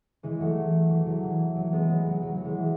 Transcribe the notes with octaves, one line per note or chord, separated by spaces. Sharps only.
E3 G#3
F#3 A3
F#3
E3
E3
F#3
E3
F#3
G#3 B3
F#3
F#3
F#3
F#3
E3 G#3